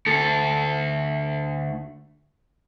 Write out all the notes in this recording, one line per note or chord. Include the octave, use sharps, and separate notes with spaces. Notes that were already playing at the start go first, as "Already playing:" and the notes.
D2 A4